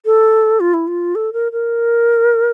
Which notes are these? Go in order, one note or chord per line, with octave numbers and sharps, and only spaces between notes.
A4
F4
E4
F4
A4
A#4
A#4